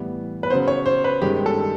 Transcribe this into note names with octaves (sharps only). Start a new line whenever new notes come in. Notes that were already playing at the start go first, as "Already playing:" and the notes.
Already playing: A2 E3 G3 B3
B4
C#3 F#3 B3 C5
C#5
C5
B4
G2 D#3 G#3 C#4 G4
A4